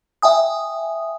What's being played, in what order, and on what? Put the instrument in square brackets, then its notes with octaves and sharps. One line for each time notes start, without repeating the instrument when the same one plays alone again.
[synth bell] E5 G5 G#5 D#6